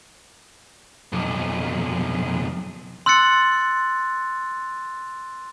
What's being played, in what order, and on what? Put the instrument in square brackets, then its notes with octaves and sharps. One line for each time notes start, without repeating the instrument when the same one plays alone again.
[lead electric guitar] B1 F2
[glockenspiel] C6 E6 F#6 A6 C#7